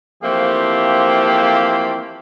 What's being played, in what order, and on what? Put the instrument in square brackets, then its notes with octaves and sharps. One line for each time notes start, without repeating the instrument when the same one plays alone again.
[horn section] E3 F3 A3 A#3 C4 G4